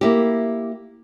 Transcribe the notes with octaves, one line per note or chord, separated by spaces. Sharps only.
A#3 E4 G4